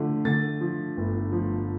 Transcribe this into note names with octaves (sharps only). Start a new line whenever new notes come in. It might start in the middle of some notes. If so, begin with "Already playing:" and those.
Already playing: D3 F3 A3
D3 A6
F3
G1
F3